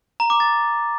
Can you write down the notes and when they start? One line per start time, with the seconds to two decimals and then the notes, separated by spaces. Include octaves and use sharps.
0.20 A#5
0.30 D6
0.40 A6